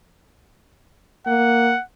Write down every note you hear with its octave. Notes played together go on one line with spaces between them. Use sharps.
A#3 F#5